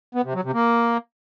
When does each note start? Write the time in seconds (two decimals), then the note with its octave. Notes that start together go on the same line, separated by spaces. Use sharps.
0.15 B3
0.24 C3
0.34 F#3
0.44 C3
0.54 A#3